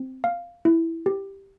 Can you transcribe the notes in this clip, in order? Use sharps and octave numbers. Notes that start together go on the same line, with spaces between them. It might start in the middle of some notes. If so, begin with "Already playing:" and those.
Already playing: C4
F5
E4
G4